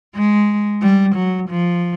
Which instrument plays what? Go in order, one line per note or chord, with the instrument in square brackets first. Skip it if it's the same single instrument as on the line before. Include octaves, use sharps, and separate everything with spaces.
[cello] G#3
G3
F#3
F3